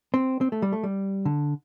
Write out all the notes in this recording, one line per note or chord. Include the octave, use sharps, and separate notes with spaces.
C4
C4
A3
G3
A3
G3
D3